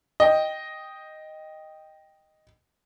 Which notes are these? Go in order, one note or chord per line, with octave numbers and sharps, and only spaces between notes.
D#5 G5